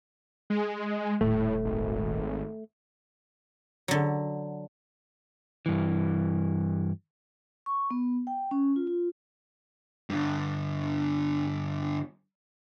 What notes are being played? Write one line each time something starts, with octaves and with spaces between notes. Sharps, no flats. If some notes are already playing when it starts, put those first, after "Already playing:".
G#3
D#1 A2 A3
G#1
D3 F#3
G2 E3
C#6
B3
G5
C#4
F4
F4
G2 D3